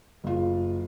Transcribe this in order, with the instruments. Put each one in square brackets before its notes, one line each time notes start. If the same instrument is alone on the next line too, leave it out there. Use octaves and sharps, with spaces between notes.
[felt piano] F#1 F4